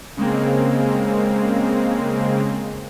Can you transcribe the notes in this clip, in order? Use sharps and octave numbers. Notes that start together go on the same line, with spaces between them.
C#3 G#3 A#3 C4